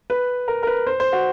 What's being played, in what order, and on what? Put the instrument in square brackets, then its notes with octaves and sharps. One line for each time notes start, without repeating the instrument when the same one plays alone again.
[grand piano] B4
A#4
A#4
B4
C5
C5
F#4